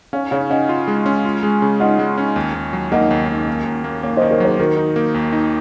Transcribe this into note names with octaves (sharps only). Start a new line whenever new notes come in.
C#4 C#5 F5
C#3 C#5 F5
C#4 D#5 F#5
F4
G#3
C#4
F4
G#3
C#3
F4 D#5 F#5
G#3
C#4
D#2
D#2
F#3
A#3 D#5 F#5
D#2
D#2
A#3
D#2
A#3
A#3 C#5 F5
C5 D#5
D#3
A#4 C#5
F#3 G#4 C5
D#3 F#4 A#4
D#4
A#3
D#2
D#4